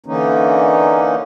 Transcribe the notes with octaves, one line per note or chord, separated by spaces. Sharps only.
D3 E3 A#3 C#4 D#4